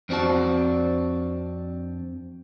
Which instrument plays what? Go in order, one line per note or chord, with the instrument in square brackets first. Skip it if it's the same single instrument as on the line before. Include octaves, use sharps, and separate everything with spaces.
[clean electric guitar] F2 C4 D4 F#4 A5